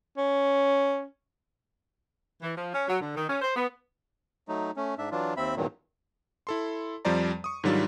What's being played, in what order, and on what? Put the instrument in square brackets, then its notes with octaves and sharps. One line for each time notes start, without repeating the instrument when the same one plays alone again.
[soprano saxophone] C#4
[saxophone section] E3
F3
C#4
F#3
D3
D#3
C#4
C5
B3
[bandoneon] F#3 A3 D#4
A3 C#4
G#2 D4 E5
E3 F#3 D4 F4
D#2 C4 E5 B5
E2 G2 A#2 D#3 F#3
[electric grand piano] E4 A4 C6
F2 F3 G3 C5 D5 A#5
C#6 D#6
G#2 D#3 F#3 G3 D4 F4